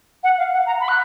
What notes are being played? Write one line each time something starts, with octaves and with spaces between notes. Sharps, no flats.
F#5
F5
F#5
A#5
B5
F#6